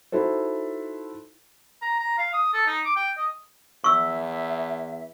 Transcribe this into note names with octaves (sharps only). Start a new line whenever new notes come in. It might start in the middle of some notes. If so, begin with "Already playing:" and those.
D#4 E4 F#4 A4 C5
A#5
A#5
F5
D#6
A4
D#4
D6
G5
D#5
E2 E5 C#6 E6